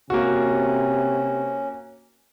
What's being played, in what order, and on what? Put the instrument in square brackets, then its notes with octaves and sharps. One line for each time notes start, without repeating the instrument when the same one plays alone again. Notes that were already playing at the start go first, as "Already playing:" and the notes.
[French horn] C3 [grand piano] A#3 F#4 [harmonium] C#4